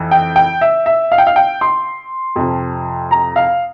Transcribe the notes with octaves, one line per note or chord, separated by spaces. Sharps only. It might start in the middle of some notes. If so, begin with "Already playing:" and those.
Already playing: F2 E3
G5
G5
E5
E5
F5
G5
F5
G5
C6
F2 C3 F3
A#5
F5